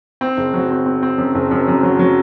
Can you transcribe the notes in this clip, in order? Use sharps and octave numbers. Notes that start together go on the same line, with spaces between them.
C4
F#1
F#3
C4
C4
C4
F#2
F#1
F#2
F#2
F#3
F#3